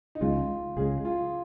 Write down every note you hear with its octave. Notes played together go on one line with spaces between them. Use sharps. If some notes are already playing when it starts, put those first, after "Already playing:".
D#4
C#2 C#3 G#3 F4
C#2 C#3 G#3 G#4
F4